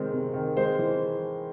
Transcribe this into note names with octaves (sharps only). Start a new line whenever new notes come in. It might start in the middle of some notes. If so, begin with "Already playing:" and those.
Already playing: C3 D#3 G#3 C4
C3
D#3
G#3 C5
E3